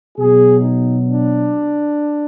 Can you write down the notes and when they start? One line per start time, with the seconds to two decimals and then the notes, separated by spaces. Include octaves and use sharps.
0.17 B2 F#3 G#4
0.60 D#4
1.04 D4